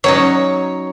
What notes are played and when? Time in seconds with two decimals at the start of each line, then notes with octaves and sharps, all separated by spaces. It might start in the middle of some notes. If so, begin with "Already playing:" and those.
0.04 F#3 C#4 D#4 C#5